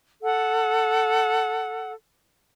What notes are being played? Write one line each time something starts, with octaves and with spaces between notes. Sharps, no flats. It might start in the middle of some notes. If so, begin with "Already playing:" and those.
A4 F#5